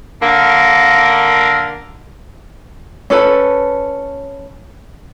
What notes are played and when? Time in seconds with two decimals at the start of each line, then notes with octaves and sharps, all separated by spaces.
0.21 D3 A#3
3.10 C#4 A4 B4 A5